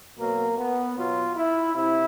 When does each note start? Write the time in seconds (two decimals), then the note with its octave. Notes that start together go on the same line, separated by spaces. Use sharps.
0.18 B2 F#3 A#3
0.58 B3
0.97 B2 F#3 F4
1.37 E4
1.75 C3 E4